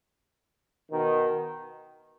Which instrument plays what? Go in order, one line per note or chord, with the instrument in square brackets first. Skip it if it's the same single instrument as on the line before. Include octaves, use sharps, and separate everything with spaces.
[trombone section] B2 D#3